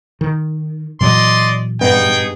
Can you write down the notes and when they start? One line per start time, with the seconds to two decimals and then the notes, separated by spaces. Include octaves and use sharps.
0.21 D#3
1.01 A#2 E3 F#3 D5 D#5 C6
1.81 G2 B3 D#4 G#4 G5